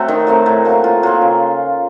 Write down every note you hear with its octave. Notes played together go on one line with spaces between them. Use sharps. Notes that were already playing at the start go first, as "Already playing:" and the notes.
Already playing: F#3 A3 C4 F#4
D#3
F#3 A3 C4
A2
F#3 A#3
A2 F4
F#3 A#3 F4
C#3